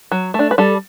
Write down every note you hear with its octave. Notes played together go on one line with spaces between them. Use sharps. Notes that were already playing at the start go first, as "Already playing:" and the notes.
F#3
A3
D4
B4
G3 A4